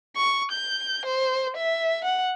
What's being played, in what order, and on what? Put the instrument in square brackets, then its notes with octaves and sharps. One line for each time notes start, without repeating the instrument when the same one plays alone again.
[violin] C#6
G6
C5
E5
F#5